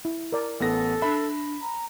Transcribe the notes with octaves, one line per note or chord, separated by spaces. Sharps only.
E4
A#4 D5
A1 B3 A4 A#6
D4 E5 B5
A#5